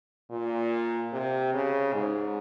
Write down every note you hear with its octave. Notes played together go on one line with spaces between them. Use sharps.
A#2
C3
C#3
G#2